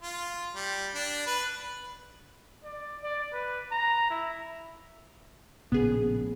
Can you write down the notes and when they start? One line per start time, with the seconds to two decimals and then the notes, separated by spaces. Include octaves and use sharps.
0.02 F4
0.55 G3
0.95 D4
1.27 B4
2.64 D5
3.02 D5
3.33 B4
3.71 A#5
4.10 E4
5.72 A#1 A2 C#3 B3 G#4